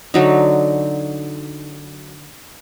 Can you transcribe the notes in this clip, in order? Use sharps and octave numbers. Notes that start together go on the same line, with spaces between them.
D3 F#3 D#4